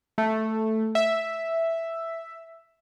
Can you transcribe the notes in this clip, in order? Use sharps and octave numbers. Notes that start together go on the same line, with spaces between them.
A3
E5